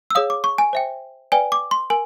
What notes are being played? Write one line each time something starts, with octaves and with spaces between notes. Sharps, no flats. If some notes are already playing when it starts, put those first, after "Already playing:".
E6
G#4 C#5 F5 D#6
D6
C#6
G#5
C5 E5 G5
B4 D5 G5 G#5
D6
C6
A#4 G#5